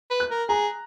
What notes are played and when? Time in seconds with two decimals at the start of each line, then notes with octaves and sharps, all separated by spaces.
0.11 B4
0.20 F#6
0.31 A#4
0.49 G#4 A#5